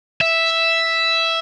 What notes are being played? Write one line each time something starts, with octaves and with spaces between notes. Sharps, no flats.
E5